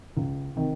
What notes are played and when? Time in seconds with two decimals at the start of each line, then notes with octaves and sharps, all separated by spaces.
0.17 C#2
0.56 C3 D#3